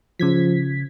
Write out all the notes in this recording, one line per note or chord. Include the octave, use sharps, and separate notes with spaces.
C#3 F3 G#6 B6